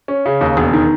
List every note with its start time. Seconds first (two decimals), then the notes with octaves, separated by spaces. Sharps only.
0.08 C#4
0.25 C#3
0.41 D#2
0.57 E1
0.73 D#3